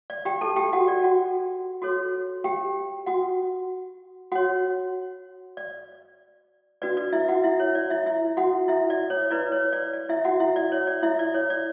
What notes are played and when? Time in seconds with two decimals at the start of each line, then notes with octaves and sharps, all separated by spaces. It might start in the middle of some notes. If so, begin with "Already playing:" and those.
0.10 D5
0.25 G4 G5
0.41 A4 A5
0.56 G4 G5
0.73 F#4 F#5
0.88 D5
1.04 F#4 F#5
1.82 F#4 A4 C#5
2.44 G4 G5
3.06 F#4 F#5
4.32 F#4 C#5 F#5
5.57 D5
6.82 D4 F#4 B4 D5
6.97 D5
7.13 E4 E5
7.28 F#4 F#5
7.44 E4 E5
7.60 C#5
7.75 D5
7.90 E4 E5
8.06 E4 E5
8.37 F#4 F#5
8.68 E4 E5
8.90 D5
9.10 C#5
9.31 E4 B4 D5
9.52 C#5
9.73 D5
9.93 D5
10.09 E4 E5
10.25 F#4 F#5
10.40 E4 E5
10.56 D5
10.72 C#5
10.87 D5
11.03 E4 E5
11.19 D5
11.34 C#5
11.50 D5